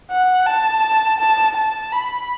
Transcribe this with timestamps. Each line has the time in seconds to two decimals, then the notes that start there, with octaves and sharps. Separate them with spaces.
0.11 F#5
0.47 A5
1.20 A5
1.56 A5
1.92 B5